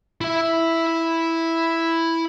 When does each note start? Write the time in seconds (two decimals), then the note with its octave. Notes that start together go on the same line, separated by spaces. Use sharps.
0.21 E4 E5